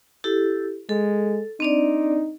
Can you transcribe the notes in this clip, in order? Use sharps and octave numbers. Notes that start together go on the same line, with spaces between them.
E4 G4 A4
G#3 A4
C4 D4 D#4 D5